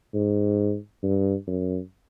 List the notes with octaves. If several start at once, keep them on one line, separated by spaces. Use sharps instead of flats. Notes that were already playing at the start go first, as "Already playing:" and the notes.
G#2
G2
F#2